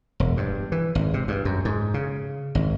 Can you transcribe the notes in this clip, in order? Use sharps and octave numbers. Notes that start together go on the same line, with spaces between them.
E1
G2
E3
G#1
C3
G2
F#2
G#2
C#3
G#1